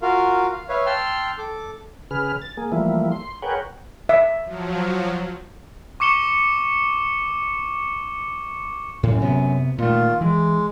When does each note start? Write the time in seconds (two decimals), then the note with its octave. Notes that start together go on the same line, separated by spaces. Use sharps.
0.02 F4 F#4 A#4 F5
0.52 F5
0.69 B4 C#5 E5 F5
0.86 G5 A5 C6 E6 F6
1.38 A4 D6
2.11 C#3 G#4 B4 F6
2.42 A6
2.57 A#3 G#4
2.72 E3 F3 G3 A3 A#3 E4
3.12 C6
3.42 G#4 A#4 B4 C#5 F#5 G5
4.09 E5
4.44 F3 F#3
6.00 C#6 D6 C#7 E7 G7
9.03 F#2 A2
9.22 C3 B3
9.78 A#2 D#3 A3 F4
10.21 E3 G#3